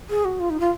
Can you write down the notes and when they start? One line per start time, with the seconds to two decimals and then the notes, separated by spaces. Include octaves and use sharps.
0.10 G#4
0.25 F#4
0.40 F4
0.50 D#4
0.60 F4